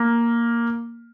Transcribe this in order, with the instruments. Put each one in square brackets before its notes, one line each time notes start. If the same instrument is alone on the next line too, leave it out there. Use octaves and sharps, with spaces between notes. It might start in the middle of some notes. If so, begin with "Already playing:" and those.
Already playing: [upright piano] A#3